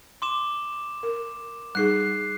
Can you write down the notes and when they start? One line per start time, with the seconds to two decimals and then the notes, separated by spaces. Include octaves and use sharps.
0.22 C6 D6 E7
1.03 A#4
1.75 G3 D#4 G#4 F#6 C7